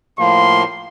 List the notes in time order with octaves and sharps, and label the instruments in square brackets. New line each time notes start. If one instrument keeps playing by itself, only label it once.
[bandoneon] A2 F3 A#3 [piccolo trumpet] C6